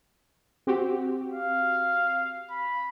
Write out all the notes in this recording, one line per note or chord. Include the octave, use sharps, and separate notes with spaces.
C4 F#4 G4
F5
B5